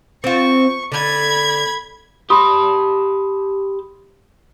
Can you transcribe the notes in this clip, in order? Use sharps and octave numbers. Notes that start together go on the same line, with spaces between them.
C4 F4 C#6
D3 B5 G#6
G4 A5 B5 C6 D#6